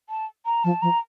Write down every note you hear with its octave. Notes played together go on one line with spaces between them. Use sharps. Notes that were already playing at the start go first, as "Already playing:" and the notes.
A5
A#5
F3 A5
F3 A#5